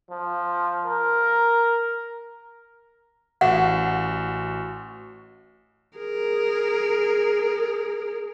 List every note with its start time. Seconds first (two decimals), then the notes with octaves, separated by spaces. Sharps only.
0.11 F3
0.87 A#4
3.41 A1 F#4 F#5
5.98 G#4 A#4